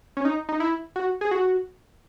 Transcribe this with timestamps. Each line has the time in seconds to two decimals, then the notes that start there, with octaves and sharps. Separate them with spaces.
0.17 C#4
0.25 D#4
0.49 D#4
0.60 E4
0.96 F#4
1.21 G#4
1.31 F#4